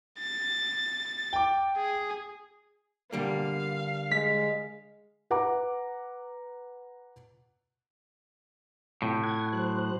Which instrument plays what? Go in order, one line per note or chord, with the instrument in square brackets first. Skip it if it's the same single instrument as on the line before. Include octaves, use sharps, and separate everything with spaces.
[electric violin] A6
[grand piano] G5 D6
[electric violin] G#4
[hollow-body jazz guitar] D3 G3 A#3 [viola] F5
[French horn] G#3 [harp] B6
[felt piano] B4 F#5 A#5 D6
[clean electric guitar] A2 [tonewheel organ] C3 F4 G5
[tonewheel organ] F#5 G#6
F#3 C5 F#6